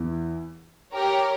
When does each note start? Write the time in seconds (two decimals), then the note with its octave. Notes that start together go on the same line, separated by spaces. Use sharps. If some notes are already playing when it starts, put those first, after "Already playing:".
Already playing: E2 E3
0.93 G4 A#4 C#5